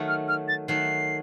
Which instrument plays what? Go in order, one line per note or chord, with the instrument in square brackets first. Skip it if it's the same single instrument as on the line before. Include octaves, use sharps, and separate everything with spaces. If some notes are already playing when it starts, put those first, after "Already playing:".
Already playing: [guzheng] D#3 F#3 A3
[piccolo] F6
F6
A6
[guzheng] D#3 F#3 A3 [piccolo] C7